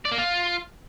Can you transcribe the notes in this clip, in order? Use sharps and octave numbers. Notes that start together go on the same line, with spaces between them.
D5
A#3
F4